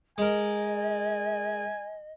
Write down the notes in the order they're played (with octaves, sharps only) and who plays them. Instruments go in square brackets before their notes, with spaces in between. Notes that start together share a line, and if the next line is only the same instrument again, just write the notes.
[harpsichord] G#3 A#4 [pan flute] D#5 [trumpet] G#5